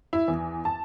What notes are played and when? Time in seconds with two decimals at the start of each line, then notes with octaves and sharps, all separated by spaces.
0.13 E4
0.28 E2
0.65 A5